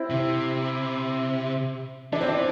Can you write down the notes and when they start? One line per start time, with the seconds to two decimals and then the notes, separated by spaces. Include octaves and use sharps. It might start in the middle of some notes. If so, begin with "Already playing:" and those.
Already playing: C4 E4
0.10 C3
2.13 E3 D4
2.21 C4
2.28 D4